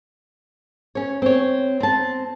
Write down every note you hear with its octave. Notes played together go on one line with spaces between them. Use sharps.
C#4 C#5
C4 C#5
C4 A5